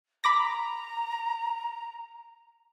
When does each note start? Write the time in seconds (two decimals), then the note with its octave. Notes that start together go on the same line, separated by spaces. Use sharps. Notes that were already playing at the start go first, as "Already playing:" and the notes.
0.24 A#5 B5 D6 A#6